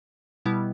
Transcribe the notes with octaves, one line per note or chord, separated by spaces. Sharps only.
B2 G3 B3 E4